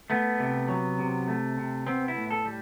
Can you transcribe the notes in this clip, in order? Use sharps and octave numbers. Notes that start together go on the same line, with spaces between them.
A3 B3
C3
F#3
C3
A3
C3
B3 C4
E4
A2
A4
G3